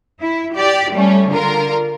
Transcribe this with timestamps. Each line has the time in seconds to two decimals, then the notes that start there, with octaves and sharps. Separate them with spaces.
0.22 E4
0.57 G4 D5
0.92 G3 A3 C#4
1.29 D3 F4 A#4